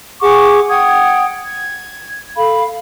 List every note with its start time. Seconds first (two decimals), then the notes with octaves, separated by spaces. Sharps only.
0.21 G#4 F#5 C#6 D6
0.69 F#5 G5 D#6 G#6
1.45 G#6
2.36 A4 F5 B5